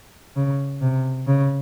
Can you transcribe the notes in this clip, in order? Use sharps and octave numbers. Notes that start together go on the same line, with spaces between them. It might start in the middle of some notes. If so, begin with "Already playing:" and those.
C#3
C3
C#3